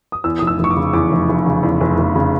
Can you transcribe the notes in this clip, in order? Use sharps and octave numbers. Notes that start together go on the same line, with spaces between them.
D#6
E2 E6
F1 D#6
E6
F1
C#6
D6
C#3
E2 D6
F1
F1
C#3
E2
F1
F1
C#3